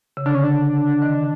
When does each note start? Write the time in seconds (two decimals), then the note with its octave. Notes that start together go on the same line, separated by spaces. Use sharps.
0.17 C#3
0.26 D3 D4
0.35 C#4
0.44 D4
1.02 D#3